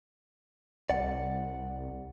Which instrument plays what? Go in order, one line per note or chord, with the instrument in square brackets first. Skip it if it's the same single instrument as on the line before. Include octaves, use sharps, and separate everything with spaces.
[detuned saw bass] C2 [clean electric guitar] D5 F#5